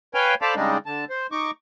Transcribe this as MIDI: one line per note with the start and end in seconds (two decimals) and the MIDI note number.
0.14 0.35 71
0.14 0.35 73
0.14 0.35 77
0.14 0.35 79
0.14 0.35 80
0.42 0.55 69
0.42 0.55 72
0.42 0.55 74
0.42 0.55 77
0.42 0.55 81
0.42 0.55 83
0.56 0.78 49
0.56 0.78 55
0.56 0.78 56
0.56 0.78 62
0.56 0.78 63
0.86 1.05 50
0.86 1.05 81
1.10 1.27 72
1.32 1.51 63
1.32 1.51 85
1.32 1.51 86